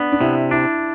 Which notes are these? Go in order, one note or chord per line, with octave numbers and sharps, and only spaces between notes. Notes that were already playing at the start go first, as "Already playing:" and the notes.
Already playing: B3 D4
D4
C3 E4
D4 E4